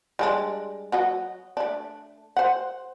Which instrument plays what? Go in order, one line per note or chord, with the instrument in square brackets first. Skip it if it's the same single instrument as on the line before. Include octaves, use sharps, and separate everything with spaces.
[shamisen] G3 G#3 D4
F#3 F#4 D#5
A3 D4
C5 F#5